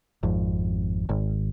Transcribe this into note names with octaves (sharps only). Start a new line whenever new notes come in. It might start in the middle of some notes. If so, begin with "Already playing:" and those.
G#1 F2
G#1